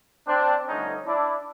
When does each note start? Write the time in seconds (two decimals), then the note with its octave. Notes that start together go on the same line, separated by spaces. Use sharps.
0.28 C4 D4
0.67 G2 D3 F3 A3 C#4 D#4
1.06 D4 E4